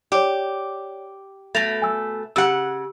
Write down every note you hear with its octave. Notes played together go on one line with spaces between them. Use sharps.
G4 C#5 D5
B2 A3 A6 A#6 F7
G#5 E6
C#3 G4 F#5 E6